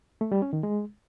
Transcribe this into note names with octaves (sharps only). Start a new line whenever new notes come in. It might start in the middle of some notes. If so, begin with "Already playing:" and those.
A3
G3
C#4
D#3
G#3